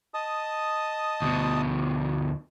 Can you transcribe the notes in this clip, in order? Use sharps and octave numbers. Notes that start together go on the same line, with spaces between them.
D#5 A5 D#6
D2 B2